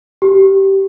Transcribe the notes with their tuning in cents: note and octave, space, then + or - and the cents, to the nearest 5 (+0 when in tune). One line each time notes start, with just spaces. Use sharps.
G4 -15